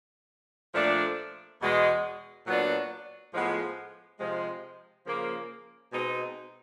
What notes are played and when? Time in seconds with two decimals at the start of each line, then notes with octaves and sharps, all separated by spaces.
0.73 A#2 F3 A3 D4
1.60 E2 B2 G#3
2.46 A#2 F#3 B3 D4
3.34 A2 F3 G#3 B3
4.20 C3 F3 G#3
5.06 C#3 F3 A#3
5.93 B2 G#3 C4 D#4